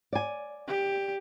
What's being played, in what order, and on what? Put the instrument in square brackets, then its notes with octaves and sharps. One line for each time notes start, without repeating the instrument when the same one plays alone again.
[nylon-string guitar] D5 G#5
[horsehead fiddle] G4